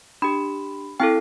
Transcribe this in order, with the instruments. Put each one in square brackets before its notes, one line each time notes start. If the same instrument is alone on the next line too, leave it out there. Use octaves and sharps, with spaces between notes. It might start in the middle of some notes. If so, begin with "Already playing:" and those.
[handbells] D4 G4 B5
C4 E4 A4 G5